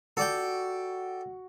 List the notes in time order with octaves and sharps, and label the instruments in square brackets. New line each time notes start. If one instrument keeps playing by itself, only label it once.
[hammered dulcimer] F#4 [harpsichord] A4 D5 G5